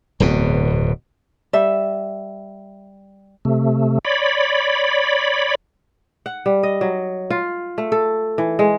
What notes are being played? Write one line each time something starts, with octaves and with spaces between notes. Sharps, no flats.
D1 E2 B2
G3 E5
C3 A3
C#5 D5 B5
F#5
G3
D#5
F#3
F4
A3
A4
E3
G#3